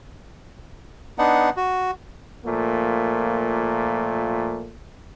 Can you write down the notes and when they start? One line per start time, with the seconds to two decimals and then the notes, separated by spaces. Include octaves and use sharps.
1.18 B3 D4 D#4 F#5
1.57 F#4
2.44 A#2 F3 A3 A#3